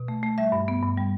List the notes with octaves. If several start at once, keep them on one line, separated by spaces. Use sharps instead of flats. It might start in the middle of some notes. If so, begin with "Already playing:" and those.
Already playing: B2
A3
A3
G3 E5
G2
B3
G2
G3